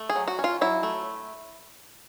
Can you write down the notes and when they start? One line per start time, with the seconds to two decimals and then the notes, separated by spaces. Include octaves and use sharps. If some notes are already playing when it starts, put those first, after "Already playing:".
Already playing: A3
0.09 G#4
0.16 F#3
0.28 F#4
0.39 C#4
0.44 F4
0.61 F#3 E4
0.83 A3